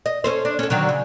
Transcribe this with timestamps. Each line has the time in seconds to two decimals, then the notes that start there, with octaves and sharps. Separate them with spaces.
0.06 D#5
0.24 C#4 A4 C5
0.45 D4
0.59 C#4 A4
0.70 D3 D#3 F#3
0.89 C#3